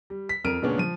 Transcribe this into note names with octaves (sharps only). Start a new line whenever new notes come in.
G3
B6
F2 A#4 F6 D7 D#7
A#2 C#3 G#3 B3 C#4 D4
F3 D#7